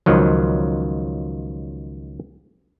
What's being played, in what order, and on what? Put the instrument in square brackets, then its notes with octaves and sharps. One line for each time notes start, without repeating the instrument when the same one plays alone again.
[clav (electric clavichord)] C#2 D#3 F3 F#3